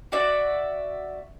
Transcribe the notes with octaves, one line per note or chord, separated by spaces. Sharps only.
F#4 D5 E5